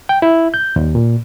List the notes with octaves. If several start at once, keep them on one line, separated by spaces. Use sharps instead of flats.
G5
E4
G6
D#2
A#2